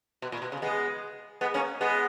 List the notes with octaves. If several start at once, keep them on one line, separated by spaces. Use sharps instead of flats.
B2
A#2
B2
C#3
G#3 B3
G#3 B3
A#3 C#4
G#3 B3